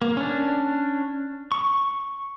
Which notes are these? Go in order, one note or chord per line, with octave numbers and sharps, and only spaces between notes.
A#3
C#4 D4
C#6